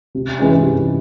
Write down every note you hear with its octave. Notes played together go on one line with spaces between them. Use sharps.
C3
E3 G#3 C#4
C3